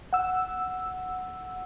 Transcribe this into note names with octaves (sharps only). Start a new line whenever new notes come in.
F#5 E6